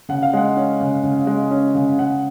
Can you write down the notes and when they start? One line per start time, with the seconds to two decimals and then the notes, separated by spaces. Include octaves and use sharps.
0.09 C#3 F#5
0.23 F5
0.33 G#3 F#5
0.57 C#4
0.81 C#3
1.04 C#3
1.27 G#3
1.51 C#4
1.75 C#3
1.99 C#3 F#5